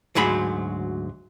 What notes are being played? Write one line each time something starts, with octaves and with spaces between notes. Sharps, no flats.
D2 G#2 F#3 G#4 B5